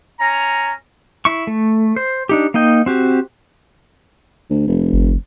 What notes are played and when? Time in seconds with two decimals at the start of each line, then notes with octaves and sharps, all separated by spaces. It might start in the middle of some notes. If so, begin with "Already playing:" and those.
0.20 C#4 A#5
1.25 E4 C#6
1.47 A3
1.96 C5
2.29 D4 D#4 G4
2.54 A#3 D#4 D#5 G5
2.86 C4 F#4 G4
4.50 D2
4.67 F1
4.93 G1